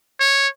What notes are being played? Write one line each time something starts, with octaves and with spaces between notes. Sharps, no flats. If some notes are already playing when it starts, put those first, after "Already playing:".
C#5